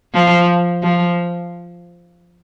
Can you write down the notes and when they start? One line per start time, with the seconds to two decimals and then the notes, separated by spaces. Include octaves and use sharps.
0.14 F3
0.83 F3